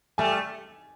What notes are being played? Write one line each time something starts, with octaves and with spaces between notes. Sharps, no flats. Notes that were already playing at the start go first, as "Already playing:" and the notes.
G3 A3 G#5